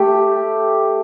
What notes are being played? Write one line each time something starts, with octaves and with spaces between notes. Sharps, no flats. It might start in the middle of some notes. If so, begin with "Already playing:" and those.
Already playing: A3 G4